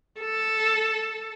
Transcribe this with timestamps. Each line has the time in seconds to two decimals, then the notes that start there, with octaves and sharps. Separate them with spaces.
0.21 A4